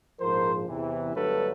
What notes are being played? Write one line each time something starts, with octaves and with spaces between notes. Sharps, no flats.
A#1 G#2 F3 G#3 A#4 C5
E2 C3 E3
G1 G2 D3 F#3 A3 A4 B4